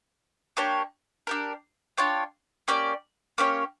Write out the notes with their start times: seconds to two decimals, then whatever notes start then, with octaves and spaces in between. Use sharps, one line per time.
0.57 A#3 D4 G4 C#5
1.27 D4 G4 A#4
1.97 D4 F4 C#5 G5
2.68 A#3 C#4 G4 D5
3.38 A#3 C#4 G4 C#5